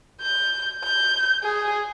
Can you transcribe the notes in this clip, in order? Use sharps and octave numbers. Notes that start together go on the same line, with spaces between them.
G6
G6
G#4